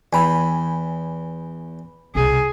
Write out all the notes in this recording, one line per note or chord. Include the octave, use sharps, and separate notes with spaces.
E2 G5 G#5 B5
C2 B2 G#4